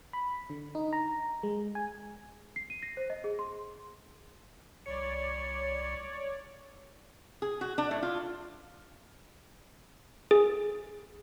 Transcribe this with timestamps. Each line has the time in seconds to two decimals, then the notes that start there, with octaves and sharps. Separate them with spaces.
0.13 B5
0.50 D3
0.75 D#4
0.93 A#5
1.43 G#3
1.75 G#5
2.56 C7
2.70 D#7
2.82 A#6
2.97 C5
3.10 D#5
3.24 G#4
3.39 C6
4.86 C2 C#5 D5 C#7
7.42 G#4
7.61 F#4
7.78 D4
7.91 A2
8.03 F4
10.31 G#4